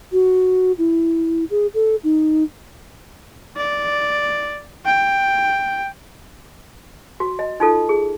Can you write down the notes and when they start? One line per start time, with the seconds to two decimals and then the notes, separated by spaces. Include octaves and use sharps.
0.12 F#4
0.78 E4
1.51 G#4
1.74 A4
2.04 D#4
3.58 D5
4.86 G5
7.20 F#4
7.39 D#5
7.60 D#4 F4 A4
7.89 G#4